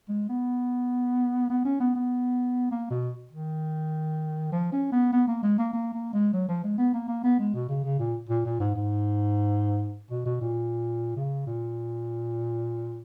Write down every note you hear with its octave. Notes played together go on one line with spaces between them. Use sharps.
G#3
B3
B3
C#4
B3
B3
A#3
B2
D#3
F3
C#4
B3
B3
A#3
G#3
A#3
A#3
A#3
G#3
F#3
F3
G#3
B3
A#3
A#3
B3
G#3
B2
C#3
C#3
A#2
A#2
A#2
G#2
G#2
B2
B2
A#2
C#3
A#2